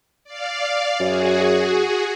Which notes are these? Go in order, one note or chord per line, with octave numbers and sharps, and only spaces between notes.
D5 F5
F#2 F#4 G#4